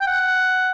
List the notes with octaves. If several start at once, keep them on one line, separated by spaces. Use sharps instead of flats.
G5
F#5